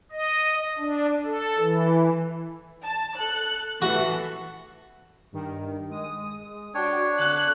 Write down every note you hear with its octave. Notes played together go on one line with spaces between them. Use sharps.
D#5
D4
A4
E3
A5
A4 F#6
A2 E3 F#4 A4
G2 D#3
G#3 D#6
D4 F#4 C#5 G5
D3 F#6